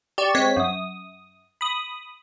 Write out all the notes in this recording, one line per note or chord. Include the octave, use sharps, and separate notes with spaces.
G4 D5 C#6 E7
G#3 C4 C#5 B6
F#2 D#6
B5 D#6